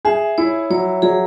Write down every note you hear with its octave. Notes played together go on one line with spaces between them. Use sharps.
G#4 E5
E4 C#5
F#3 C#5
F#3 G#4